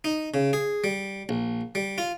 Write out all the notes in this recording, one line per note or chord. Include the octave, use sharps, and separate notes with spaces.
D#4
C#3
G#4
G3
A#1
G3
F4